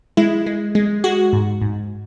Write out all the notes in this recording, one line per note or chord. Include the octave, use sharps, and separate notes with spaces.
G#3 E4
G#3
G#3
G#3 F#4
G#2
G#2